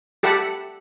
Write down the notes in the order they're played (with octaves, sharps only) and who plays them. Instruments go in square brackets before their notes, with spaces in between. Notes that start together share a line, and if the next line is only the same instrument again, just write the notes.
[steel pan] G4 A4 E5 F#5 A5 B5